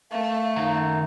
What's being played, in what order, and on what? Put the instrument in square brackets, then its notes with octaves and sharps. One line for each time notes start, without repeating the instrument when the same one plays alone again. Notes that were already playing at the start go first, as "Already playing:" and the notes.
[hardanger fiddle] A3 [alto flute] F5
[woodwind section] F#2 D#4 [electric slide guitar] D#3 F#5 A#5